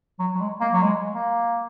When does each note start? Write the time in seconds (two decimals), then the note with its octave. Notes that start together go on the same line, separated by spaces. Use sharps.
0.19 F#3
0.35 F#3
0.40 G#3
0.61 A#3
0.73 F#3
0.82 G#3
1.13 A#3